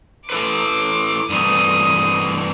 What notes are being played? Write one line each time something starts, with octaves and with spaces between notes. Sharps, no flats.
E4 A4 B4 D6
G2 E3 A3 D#6